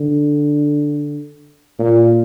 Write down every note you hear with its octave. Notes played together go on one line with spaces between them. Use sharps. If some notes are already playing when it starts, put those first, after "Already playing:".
Already playing: D3
A#2